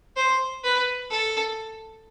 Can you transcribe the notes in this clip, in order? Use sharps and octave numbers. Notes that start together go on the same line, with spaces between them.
C5
B4
A4